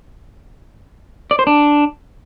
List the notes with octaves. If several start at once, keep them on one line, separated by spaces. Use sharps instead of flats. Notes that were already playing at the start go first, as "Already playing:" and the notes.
D5
C5
D4